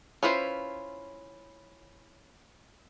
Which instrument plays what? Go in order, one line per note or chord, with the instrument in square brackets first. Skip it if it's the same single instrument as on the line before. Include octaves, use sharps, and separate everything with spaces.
[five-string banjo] C#4 E4 F4 B4 C5